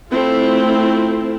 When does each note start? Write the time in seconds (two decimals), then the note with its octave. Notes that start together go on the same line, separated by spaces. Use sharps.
0.11 A3 C4 E4 F4